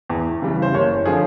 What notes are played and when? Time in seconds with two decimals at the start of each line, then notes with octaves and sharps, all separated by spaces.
0.10 E2
0.42 C#3 E3 G3
0.62 C5
0.74 F#1 C#5
1.05 D3 F3 G#4